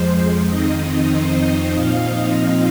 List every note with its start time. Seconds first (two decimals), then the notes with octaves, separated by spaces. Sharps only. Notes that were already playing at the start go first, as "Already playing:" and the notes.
Already playing: F2 F3 G#3 C5
0.45 F2 D#3 C4 D#4 D#5
1.09 C5
1.73 A#2 F3 C4 D#4 F5
2.05 D#5
2.37 F5